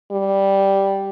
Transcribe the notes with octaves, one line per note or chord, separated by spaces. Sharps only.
G3